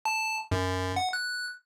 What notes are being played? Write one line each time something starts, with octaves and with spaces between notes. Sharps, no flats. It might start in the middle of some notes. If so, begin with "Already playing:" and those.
A5
F#2
F#5
F#6